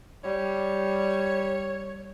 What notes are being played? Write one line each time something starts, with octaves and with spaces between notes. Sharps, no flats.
G3 C#5